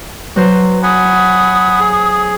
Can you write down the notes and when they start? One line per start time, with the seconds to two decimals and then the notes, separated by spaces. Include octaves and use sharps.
0.36 F#3 B4 C5
0.83 F#5 G#5 B5 D#6
1.80 G#4